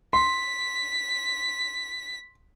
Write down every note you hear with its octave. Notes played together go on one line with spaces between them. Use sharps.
C6 B6